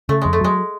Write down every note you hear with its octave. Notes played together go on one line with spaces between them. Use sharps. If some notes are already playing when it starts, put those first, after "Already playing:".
C#3 A3
F2 G#3
A3
F#3 G#3